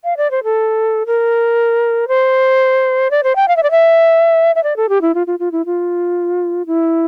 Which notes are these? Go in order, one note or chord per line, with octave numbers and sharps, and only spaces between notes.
F5
D5
C5
A4
A#4
C5
D5
C5
G5
F5
E5
D5
E5
E5
D5
A4
G4
E4
F4
F4
F4
E4
F4
E4